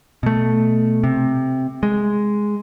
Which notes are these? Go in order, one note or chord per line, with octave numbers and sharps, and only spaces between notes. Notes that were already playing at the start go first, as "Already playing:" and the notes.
B2 A3
C3
G#3